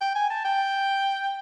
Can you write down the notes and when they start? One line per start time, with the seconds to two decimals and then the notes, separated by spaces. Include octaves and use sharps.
0.01 G5
0.15 G#5
0.30 A5
0.45 G5